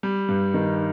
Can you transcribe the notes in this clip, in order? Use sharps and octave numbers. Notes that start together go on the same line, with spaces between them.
G3
G2
D#3